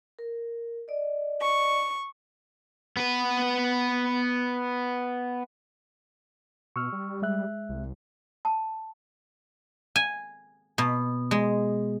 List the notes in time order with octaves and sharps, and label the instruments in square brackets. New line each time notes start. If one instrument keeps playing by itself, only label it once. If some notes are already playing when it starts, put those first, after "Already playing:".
[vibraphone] A#4
D5 D#5
[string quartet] C#6
[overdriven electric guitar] B3 B4
[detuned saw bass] B2 [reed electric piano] C#6 E6 F6
[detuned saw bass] G3
[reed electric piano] G#3 E5 F#6
[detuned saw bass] C2
[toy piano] A5
[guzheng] G#5
B2
G#3